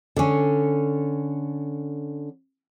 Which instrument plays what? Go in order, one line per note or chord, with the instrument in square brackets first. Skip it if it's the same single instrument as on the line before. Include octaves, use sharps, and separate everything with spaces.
[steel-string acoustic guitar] D3 C#4